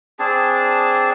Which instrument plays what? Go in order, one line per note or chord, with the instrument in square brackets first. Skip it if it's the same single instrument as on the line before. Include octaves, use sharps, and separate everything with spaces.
[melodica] C4 D4 G#4 A5